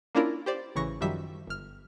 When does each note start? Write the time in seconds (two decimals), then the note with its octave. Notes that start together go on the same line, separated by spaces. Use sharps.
0.15 A#3 C#4 D4 E4 F4 A#4
0.46 G4 C5 D5
0.75 A1 C#3 E3 C#6 A#6
1.01 F#2 D#3 F3 G3 E5 B6
1.47 G1 F6